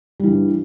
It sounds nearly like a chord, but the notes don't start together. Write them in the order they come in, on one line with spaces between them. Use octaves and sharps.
G3 E3 G2